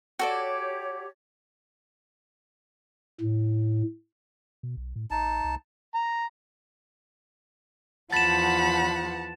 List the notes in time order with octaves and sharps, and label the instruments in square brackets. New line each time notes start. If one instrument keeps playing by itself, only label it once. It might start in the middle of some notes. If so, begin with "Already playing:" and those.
[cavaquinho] F#4 A4 D5 [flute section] G4 C#5
[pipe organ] A2
[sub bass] B2
B1
A2
[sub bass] A1 [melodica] D#4 A5
[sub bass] C2
[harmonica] A#5
[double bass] E2 F3 [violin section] F#5 A5 [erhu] B5 [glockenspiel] A6 E7